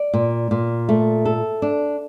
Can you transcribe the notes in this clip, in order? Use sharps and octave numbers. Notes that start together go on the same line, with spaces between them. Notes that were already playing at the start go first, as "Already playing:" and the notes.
Already playing: D5
A#2
A#2
A3
A4
D4